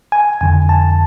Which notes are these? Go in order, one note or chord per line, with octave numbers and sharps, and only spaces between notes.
G#5
F2 D3 F3 G#5
A5